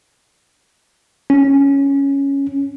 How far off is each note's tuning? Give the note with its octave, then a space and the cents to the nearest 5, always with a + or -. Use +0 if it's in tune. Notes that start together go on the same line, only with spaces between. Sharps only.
C#4 +0